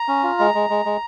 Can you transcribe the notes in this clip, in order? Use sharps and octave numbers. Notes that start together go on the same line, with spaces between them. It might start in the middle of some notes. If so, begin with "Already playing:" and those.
Already playing: A#5
C#4
F4
G#3
G#3
G#3
G#3